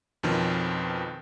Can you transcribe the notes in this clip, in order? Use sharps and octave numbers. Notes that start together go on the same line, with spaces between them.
F2 B2 D#3 F3 C4 C#4